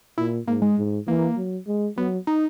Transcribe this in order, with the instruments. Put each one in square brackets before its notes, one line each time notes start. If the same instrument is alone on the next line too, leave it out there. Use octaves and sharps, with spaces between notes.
[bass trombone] A#2 [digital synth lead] E4
[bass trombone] G#2 [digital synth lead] A#3
[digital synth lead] G#3
[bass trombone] G#2
[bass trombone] E3 [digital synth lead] A#3
[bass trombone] F#3
G#3
[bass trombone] F#3 [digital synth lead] B3
[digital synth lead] D#4